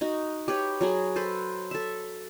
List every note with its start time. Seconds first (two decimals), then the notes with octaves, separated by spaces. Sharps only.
0.01 D#4 F#4
0.48 G4 B4 C#5
0.81 F#3 F#4 G#4
1.16 A4 B4 C5
1.71 A4 E5